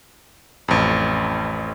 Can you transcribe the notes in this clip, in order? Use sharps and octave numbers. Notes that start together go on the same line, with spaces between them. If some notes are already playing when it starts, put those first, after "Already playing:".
A1 F2